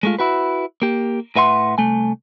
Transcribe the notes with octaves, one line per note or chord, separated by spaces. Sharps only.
G#3 A3 F4
E4 F#4 B4
A#3 G4
A2 B4 E5 F#5 C6
C2 A3 G#5